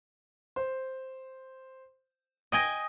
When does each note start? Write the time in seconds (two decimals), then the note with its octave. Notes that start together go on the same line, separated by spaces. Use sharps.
0.56 C5
2.52 D#5 G5 G#5 D#6 A#6